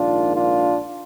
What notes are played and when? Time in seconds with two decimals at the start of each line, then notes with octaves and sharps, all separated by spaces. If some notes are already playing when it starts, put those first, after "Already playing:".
Already playing: A#1 G#2 D#3 D4 F4
0.35 D4 F4